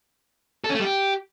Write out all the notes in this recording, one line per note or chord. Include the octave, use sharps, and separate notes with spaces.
A4
C#4
A3
G3
G4